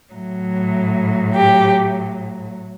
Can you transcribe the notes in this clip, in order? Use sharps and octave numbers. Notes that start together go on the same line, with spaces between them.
A2 F#3
G4